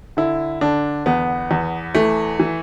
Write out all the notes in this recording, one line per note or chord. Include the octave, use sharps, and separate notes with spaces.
D3 E4
D3 D4
E2 B3
E2
E3 A3
E3